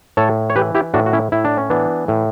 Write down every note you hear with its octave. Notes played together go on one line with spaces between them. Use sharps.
A2 A4 C#5
C#5
E3 G4 B4
E4 G4
A2 D4 F#4
F#4
C#4 E4
A2 E4
D4
C#4
E3 B3 D4
A2